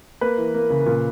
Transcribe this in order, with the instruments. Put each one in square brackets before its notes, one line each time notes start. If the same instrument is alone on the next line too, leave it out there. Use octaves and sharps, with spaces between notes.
[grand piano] A#3 B4
E3
A#3
C#3
A#2